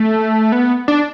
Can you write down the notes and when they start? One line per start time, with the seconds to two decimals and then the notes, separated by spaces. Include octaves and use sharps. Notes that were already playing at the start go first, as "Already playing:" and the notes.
Already playing: A3
0.52 B3
0.88 D4